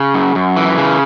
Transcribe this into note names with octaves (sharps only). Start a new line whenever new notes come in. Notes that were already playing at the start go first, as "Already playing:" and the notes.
Already playing: C#3
F#2
F#2
E3
C#3